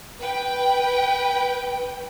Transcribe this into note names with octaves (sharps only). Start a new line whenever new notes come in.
B4 G5